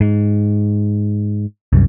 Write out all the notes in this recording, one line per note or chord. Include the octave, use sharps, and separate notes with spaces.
G#2
C2 F#2